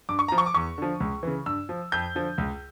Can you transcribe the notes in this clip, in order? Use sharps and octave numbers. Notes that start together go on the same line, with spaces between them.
G2 D6
C#6
F3 A#5
C#6
D6
E2 C#6
D3 F3
C#2
C#3 E3
G2 E6
F3
F2 G6
D3 F3
C#2